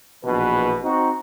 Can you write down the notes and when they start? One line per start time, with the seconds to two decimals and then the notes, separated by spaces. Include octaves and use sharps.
0.24 A#1 B2 E3 B4
0.83 C4 D#4 F#4